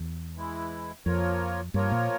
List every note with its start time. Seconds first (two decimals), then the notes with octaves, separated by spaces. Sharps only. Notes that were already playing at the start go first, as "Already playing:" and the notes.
Already playing: E2
0.36 E3 G#3 E4
1.05 F2 F3 A#3 F4 A#4 C#5
1.74 G2 F3 A#3 F4 A#4 C#5
1.91 A#2